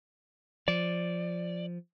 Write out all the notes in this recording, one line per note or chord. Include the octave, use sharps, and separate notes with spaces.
F3 D5